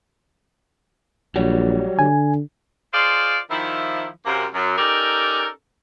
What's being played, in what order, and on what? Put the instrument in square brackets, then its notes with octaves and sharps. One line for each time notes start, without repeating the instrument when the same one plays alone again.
[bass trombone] A#1 [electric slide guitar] F#3 G3
[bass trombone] D3 [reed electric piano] G#5
[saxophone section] F4 G#4 C5 D5 D#5 F5
D#3 F3 E4
F#2 C3 A#3
F#2
C#4 D#4 G4 A4 A#4 D5